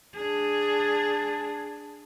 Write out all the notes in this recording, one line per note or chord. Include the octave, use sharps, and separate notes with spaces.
D4 G#4